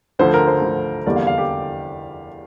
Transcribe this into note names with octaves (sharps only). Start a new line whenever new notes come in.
D2 D3 F3 C5
A#4
C5
D2 D3 F3
F1 E2 D3 G3 A#3 D5
F5
F5
G4